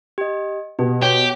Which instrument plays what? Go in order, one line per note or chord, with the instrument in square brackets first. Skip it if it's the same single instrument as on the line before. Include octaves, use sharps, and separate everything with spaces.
[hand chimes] G4 D#5
[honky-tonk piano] B2 [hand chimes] G4
[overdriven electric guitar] G4 [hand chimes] C#5